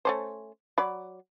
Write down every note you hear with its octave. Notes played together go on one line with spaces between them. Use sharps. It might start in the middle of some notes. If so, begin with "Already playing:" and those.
A3 C#4 C5
F#3 D5 B5